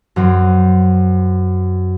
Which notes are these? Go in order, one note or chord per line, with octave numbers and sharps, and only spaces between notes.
F#2 F#3 C4